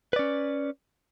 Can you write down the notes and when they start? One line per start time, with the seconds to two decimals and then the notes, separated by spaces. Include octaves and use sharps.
0.13 B4
0.16 D5
0.19 C#4